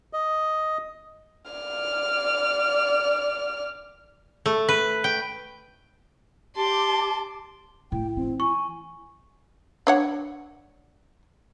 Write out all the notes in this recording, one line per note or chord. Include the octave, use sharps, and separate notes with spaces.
D#5
D5 F6
A3
B4
G5
G4 A5 C6 D6
A2 E4 G5
E3 C4
G#5 C#6
D4 C#5 F#5